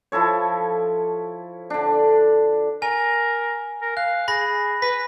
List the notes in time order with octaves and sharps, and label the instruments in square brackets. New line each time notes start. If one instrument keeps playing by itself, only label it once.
[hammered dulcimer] F3 E4 A4 C#5
D3 D4
[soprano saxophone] A#4 [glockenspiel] G#5
[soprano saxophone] A#4
[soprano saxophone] F5 [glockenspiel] F#6
[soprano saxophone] G#4 [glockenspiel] B5 A#6
[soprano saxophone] B4 [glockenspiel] B6